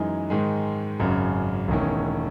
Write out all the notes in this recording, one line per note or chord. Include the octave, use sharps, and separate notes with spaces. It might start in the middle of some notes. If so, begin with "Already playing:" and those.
Already playing: F#2 E3 G#3 D#4
G#2 D#3 G#3
G#1 F#2 C#3
E1 E2 D#3 A3 C#4